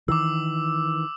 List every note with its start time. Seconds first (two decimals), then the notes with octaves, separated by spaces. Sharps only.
0.08 D#3 E3 D6 E6